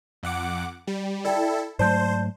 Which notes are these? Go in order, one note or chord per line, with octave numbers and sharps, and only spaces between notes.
F2 F#5 D6
G3
E4 A4 D5 G5
G#2 F#3 A3 C5 D5 A5 G6